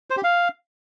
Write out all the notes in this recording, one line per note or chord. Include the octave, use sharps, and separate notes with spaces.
C5
G4
F5